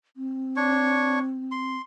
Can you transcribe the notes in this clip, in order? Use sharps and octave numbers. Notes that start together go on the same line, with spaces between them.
C4
D4 C#5 C#6
C6